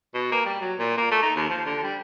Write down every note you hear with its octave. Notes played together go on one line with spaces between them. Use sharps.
B2
A#3
G3
F#3
A#2
A#3
A3
D#4
D#2
F3
D3
G3